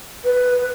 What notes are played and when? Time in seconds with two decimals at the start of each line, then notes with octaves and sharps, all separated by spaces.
0.25 B4